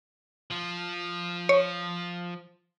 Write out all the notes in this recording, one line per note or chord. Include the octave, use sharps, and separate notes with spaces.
F3 F4
C#5